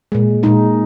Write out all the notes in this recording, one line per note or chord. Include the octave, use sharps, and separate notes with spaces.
A#2 G#3
A#2 G#3 D#4